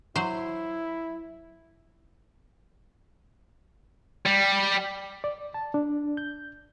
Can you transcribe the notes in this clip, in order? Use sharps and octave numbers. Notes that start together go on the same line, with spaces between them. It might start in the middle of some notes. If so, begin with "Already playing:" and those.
F#3 E4 C5
G3
D5
A5
D4
G6